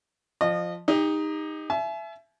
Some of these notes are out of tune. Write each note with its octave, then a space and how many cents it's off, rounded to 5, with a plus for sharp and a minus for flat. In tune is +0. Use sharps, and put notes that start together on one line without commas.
F3 +0 D#5 -35
D#4 +0 G4 +35
E5 +20 G#5 +45